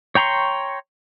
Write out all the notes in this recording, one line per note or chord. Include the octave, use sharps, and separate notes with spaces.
C#5 G5 A#5 C6 C#6